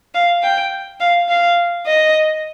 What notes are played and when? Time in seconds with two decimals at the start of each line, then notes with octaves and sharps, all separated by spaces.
0.14 F5
0.43 G5
1.00 F5
1.29 F5
1.86 D#5